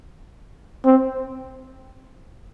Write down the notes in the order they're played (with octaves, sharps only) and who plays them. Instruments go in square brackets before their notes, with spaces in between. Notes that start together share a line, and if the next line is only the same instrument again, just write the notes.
[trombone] C4